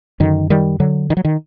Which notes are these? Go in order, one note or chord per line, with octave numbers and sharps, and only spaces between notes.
F#2 D3 D#3
D#3 G3
D3 F#3
D#3
F#3
D#3